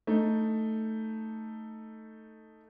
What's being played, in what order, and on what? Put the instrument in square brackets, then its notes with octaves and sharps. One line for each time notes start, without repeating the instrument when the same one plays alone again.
[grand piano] A3 D#4